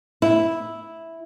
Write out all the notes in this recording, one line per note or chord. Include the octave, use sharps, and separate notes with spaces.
E4